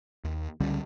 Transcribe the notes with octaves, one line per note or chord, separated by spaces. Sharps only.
D#2
C#2 D3 G3 C#4